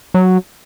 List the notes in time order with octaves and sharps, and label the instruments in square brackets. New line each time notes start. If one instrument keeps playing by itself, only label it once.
[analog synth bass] F#3